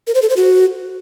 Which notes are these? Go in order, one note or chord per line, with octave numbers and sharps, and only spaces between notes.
A#4
C5
A4
C5
F#4